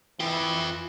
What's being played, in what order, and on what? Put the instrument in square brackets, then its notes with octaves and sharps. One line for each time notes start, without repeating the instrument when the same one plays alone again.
[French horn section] E3 [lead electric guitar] F4 G5